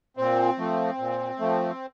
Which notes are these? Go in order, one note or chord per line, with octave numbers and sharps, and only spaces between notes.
A#2 C4
F3 A3
A#2
F3 A3